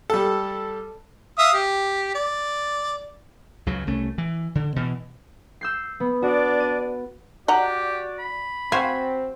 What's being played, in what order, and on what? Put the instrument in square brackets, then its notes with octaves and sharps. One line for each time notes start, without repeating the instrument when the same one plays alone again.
[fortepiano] G3 A4
[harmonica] E5 F5 D#6
G4
D5
[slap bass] C#2 C#3 F#3
C2 A3 C#4
E3
D3
B2 E3
[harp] E6 G6 C7
B3
[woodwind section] D4 D5 [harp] F#4
[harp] D#7
[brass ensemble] F#4 D5 [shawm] G4 [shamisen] D#5 F#5 A#5
[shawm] B5
[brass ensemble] C4 [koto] F#4 C5 G#5 [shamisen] F5